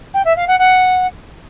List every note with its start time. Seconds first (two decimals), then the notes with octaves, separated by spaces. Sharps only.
0.14 G5
0.25 E5
0.36 F5
0.47 F#5
0.58 F#5